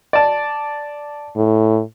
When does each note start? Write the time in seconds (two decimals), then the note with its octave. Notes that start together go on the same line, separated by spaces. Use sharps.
0.13 D5 A5
1.37 A2